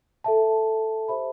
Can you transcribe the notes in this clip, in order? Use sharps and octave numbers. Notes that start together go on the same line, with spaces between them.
A4 E5 A5
G4 C5 E5 B5